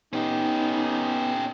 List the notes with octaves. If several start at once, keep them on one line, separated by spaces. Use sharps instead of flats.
B3 C#4 D#4 G4